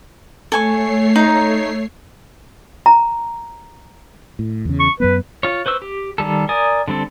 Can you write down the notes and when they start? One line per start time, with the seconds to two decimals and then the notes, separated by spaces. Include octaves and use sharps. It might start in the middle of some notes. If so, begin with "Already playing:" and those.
0.52 A3 A4 C#5 G#5 C#6 C7
1.16 D#4 A#5
2.86 A#5
4.39 A2
4.65 E2 C#3
4.80 C#6
5.00 F#2 F#3 B3 B4
5.43 F4 C#5
5.66 B4 C5 C#6 E6
5.82 G4
6.18 D#3 F3 G3 A4
6.49 A#4 D5 G#5 D#6
6.88 D3 G3 C4 A4